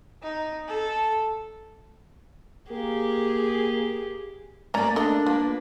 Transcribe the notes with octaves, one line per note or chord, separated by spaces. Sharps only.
D#4
A4
A#3 G4 G#4
A3 A#3 C#4 D5 A#5
D4 A4 D5 D#5
A#3 F4 B4